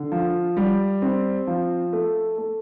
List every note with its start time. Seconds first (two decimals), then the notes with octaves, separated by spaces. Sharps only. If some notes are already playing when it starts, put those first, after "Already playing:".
Already playing: D3
0.12 F3
0.57 G3
1.02 C4
1.47 F3
1.93 A3
2.38 A3